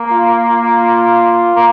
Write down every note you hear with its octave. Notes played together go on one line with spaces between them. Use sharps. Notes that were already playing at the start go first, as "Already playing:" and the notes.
Already playing: A#3
F4
F4
A#3